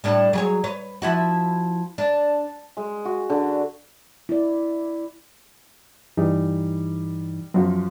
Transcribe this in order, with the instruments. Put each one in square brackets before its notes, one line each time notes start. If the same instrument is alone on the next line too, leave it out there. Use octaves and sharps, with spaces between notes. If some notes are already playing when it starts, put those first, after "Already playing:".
[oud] A2 G3 D4
F#3 G#4 C#5
B4 C#5
F3 E4 F#4
D4
[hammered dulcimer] G#3
F#4
D3
[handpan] E4 D5
[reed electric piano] G2 E3 D#4 [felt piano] G3
[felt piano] F#2 F3 [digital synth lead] F#3